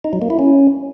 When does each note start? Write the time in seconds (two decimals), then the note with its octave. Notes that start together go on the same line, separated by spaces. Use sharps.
0.04 D#4
0.13 F#3
0.22 A#3
0.30 E4
0.39 C#4